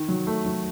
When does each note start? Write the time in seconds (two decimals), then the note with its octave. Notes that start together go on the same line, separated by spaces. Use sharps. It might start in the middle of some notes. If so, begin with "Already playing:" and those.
Already playing: D#3
0.09 F#3
0.27 A3
0.46 F#3